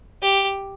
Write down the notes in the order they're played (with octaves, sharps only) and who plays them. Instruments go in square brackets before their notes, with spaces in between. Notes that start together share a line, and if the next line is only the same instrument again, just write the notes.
[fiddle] G4